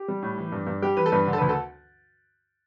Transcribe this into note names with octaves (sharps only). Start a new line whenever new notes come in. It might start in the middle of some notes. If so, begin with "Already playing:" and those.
Already playing: G4
G3
A2
E3
G2
G2
G3 G4
E3 B4
A4
G2 B4
D3
A4
D2 B4
A4